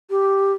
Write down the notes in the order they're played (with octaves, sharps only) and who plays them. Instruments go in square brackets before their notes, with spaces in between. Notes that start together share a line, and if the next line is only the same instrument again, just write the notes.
[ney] G4